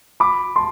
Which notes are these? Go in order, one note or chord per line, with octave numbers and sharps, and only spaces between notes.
B5 D6
A5 C6